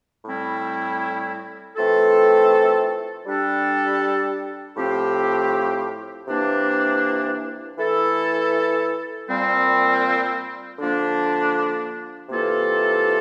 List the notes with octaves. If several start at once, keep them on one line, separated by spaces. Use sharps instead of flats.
A2 G3 C4 E4
E3 A3 C4 F4 A4
G3 D4 A4
A2 F3 C4 G4
C3 E3 A#3 D4
E3 A3 E4 A4
A#2 G3 C4
D3 F3 A#3 D4
C3 E3 A#3 F4 A4